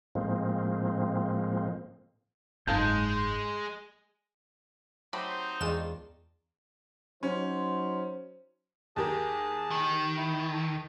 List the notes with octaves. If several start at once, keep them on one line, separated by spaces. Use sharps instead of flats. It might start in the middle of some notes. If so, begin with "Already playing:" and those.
A2 F3 G#3 A#3 C4
F#1 G#2 G#3 D#4 F5 A5 G6
F#3 A3 C4 D#4 G4 C5 B5
E2 D#3 G#3 D4 F4 E7
F#3 C#4 D#4 C5
D#2 G4 G#4 A#4 A5
D#3
E4
A4